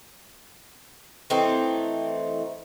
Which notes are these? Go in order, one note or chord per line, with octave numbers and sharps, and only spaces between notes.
E3 A3 C4 D#4